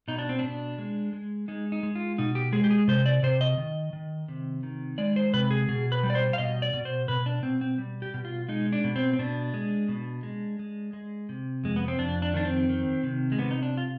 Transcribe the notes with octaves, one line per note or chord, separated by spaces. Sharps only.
B2 D#4
D4
C4
B2 D4
G#3
G#3
G#3 D#4
D#4
G#3
F4
B2 D#4
G4
G#3 G#4
G4
G#4
C3 C5
D5
C3 C5
D#5
D#3
D#3
C3
D#3
G#3 D5
C5
C3 B4
G#4
B2 G#4
B4
G3
D5
C5
F5
B2 D#5
D5
B2
C5
B2 B4
D4
B2 C4
C4
G3
G4
B2
F4
G#3 D#4
D4
B2
C4
C4
B2 D4
G#3
B2
G#3
G#3
G#3
C3
F2 G#3
B3
C4
F2 D4
D4
D#3 D4
C4
D#3
C3
G#3
C3 B3
D#4
D4
F4